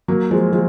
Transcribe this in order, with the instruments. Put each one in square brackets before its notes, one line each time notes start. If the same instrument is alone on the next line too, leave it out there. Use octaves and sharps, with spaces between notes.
[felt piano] F#3 A#3
F3 G#3
F3 G#3